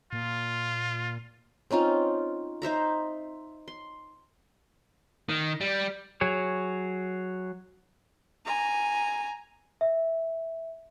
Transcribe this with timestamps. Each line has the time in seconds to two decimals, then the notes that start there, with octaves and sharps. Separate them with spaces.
0.13 A#2 F4
1.71 C4 C#4 D#4 F4
2.62 D#4 C5 E5 A#5
3.68 C6
5.29 D#3
5.61 G3
6.21 F#3 G#4 C#5
8.46 G#5 A#5
9.81 E5